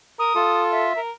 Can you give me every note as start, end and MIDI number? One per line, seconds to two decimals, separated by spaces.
0.19 0.33 70
0.19 0.64 87
0.35 0.93 65
0.35 0.87 69
0.71 1.00 76
0.97 1.11 70